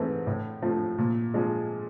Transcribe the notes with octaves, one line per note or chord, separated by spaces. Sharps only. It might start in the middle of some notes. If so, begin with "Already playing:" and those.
Already playing: G#2 E3 A3 C4
A2
F3 A3
A#2
F3 G#3